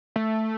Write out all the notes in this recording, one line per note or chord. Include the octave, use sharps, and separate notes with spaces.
A3